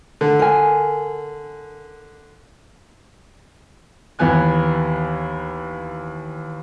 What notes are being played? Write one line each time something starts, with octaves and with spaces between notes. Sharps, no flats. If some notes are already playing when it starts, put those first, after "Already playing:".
D3
A#4 G#5
D#2 E3 B3 G#5 F#6